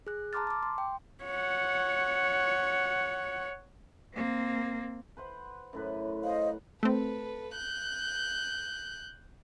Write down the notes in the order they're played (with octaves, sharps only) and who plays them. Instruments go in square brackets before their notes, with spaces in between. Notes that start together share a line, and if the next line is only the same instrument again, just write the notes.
[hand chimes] G#4 F#6
A5 A#5 C6 D6 F6 A6
A5 D6
C6
G5
[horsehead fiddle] C#5 F#5
[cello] A#3 C4
[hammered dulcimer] B4 C5 F#5
F#2 A2 B4
[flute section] C5 D#5 F5 [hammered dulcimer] F#5
[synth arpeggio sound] A3 C4 [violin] A4 B4
[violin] F#6 G6